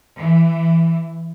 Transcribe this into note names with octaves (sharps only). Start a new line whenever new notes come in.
E3